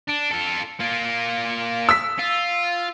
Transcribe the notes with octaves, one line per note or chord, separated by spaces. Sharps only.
D4
F4 A4
A#3 F4
E6 B6
F4